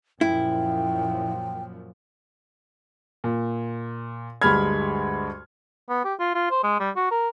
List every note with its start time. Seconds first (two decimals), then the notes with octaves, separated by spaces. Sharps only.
0.21 F#2 A#2 F3 E4 G5
3.24 A#2
4.42 D2 G2 G#3 B5 F6 G#6
5.89 B3
6.05 G4
6.20 F4
6.35 F4
6.51 C5
6.63 G#3
6.80 G3
6.96 F#4
7.11 A#4